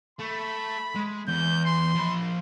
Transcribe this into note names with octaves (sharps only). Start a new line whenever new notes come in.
A3 B5
G#3
E2 G6
C6
F3 B5